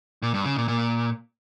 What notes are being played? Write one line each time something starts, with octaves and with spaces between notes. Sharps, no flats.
A#2
G2
C#3
A#2
A#2